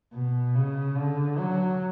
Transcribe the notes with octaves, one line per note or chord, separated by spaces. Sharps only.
B2
C#3
D3
F#3